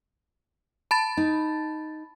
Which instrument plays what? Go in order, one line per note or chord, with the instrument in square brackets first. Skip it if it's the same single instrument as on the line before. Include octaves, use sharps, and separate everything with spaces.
[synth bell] A5 B5 A6
[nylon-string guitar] D#4